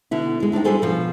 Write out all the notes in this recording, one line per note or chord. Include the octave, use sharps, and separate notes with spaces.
B2 D3 E4
G#3 E4
D4 D#4 D5 G5
G3 D4 F4 G#4 A4 C5
B2 F3